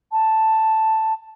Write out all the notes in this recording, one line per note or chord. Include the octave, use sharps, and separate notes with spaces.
A5